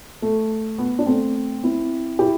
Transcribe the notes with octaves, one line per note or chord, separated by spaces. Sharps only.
A3
B3
D4
A3 C4
C4 E4
E4 G4